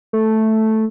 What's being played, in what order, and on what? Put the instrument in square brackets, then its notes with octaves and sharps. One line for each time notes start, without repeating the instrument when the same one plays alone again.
[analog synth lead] A3